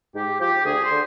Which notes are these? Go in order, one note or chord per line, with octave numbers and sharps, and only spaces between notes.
G#2 G4
F3 G4
D2 G#4
C5
D3